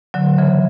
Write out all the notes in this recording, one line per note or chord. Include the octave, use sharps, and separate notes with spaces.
D3 F#3
C#3 E3